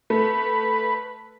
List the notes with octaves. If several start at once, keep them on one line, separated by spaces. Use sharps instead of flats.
A3 B4